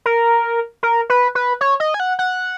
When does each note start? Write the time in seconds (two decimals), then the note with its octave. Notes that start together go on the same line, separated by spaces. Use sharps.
0.06 A#4
0.83 A#4
1.10 B4
1.35 B4
1.61 C#5
1.80 D#5
1.94 G#5
2.00 F#5
2.19 F#5